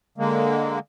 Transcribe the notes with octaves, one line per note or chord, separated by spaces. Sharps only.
D3 G#3 A#3